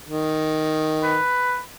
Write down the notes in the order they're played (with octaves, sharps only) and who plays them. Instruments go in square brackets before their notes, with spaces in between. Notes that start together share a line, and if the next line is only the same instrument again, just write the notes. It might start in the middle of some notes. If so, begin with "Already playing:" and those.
[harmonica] D#3
[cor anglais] B4